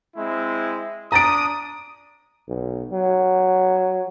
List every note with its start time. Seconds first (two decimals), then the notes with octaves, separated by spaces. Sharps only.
0.16 G#3 C4 E4
1.12 D4 A#5 D#6 A6 D7
2.49 B1
2.93 F#3